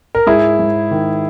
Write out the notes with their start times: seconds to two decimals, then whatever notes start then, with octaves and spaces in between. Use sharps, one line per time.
0.15 A#4
0.27 G#2 E4 G#4
0.59 G#2
0.91 D#3